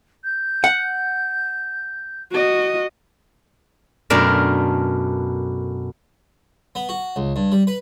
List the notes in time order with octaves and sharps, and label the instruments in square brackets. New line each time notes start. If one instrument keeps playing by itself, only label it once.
[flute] G6
[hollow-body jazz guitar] F#5
[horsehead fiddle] F#4 D#5
[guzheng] F#2 B2 A3 D4 A#4
[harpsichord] B3
F#4
C#2
G2
G3
B4